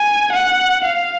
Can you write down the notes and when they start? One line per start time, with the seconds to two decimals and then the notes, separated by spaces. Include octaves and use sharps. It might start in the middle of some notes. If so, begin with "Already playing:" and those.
Already playing: G#5
0.32 F#5
0.85 F5